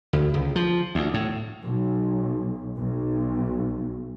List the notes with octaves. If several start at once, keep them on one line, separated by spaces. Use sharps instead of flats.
D2
C#2
F3
D2
A2
B1
B1